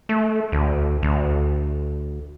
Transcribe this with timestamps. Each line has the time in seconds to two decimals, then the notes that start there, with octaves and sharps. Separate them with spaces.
0.09 A3
0.52 D2
1.03 D2